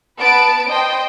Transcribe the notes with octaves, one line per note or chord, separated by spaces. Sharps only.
B3 B4 A5 D7
C5 D#5 G5